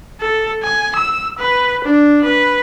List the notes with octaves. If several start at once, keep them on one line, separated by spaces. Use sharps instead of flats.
A4
G#5
E6
B4
D4
B4